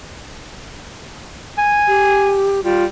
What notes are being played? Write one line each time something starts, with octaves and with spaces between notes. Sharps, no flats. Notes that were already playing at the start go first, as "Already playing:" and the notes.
G#5
G4
G3 F4